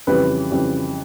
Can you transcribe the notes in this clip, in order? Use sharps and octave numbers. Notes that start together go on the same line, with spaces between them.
F2 C#3 E3 G3 B4
F2 C#3 E3 G3